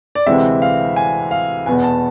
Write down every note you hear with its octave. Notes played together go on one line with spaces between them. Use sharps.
D5
D2 C3 E3 G#3 C4 E5
F5
G#5
F5
E2 B2 B3 G#5
A5